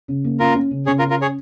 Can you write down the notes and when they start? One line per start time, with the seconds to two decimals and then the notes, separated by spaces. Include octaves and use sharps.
0.08 C#3
0.24 A#3
0.39 C#4 F4 A#4
0.55 C#4
0.71 C#3
0.86 C#3 G#4 C#5
0.99 F4 A#4
1.02 C#4
1.10 F4 A#4
1.22 G#4 C#5